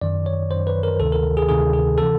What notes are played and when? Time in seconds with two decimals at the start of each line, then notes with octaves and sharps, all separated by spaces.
0.01 F#2 D#3 D5
0.26 C#5
0.51 F#2 D#3 C5
0.67 B4
0.83 A#4
1.00 D2 C3 D#3 A4
1.12 A#4
1.37 G#4
1.49 D2 C3 D#3 G#4
1.73 G#4
1.98 C3 E3 A4